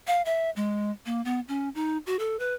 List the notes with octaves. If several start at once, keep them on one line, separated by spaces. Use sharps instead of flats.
F5
E5
G#3
A#3
B3
C#4
D#4
F#4
A4
B4